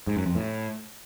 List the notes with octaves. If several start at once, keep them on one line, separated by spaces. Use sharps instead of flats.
G#2
F#2
F2
A2